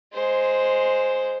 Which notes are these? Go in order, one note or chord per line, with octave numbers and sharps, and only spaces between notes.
G#3 C5